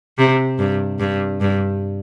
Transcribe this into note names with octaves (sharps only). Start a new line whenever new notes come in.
C3
G2
G2
G2